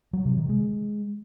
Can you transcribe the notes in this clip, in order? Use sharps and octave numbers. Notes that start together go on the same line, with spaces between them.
F#3
C3
D#3
G#3